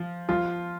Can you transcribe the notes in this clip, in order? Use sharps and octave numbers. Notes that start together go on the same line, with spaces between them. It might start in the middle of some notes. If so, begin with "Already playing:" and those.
Already playing: F3
F3 F4